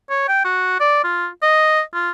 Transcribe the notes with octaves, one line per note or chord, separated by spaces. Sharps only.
C#5
G5
F#4
D5
F4
D#5
F4